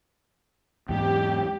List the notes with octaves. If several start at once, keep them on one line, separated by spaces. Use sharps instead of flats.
E2 G#2 G4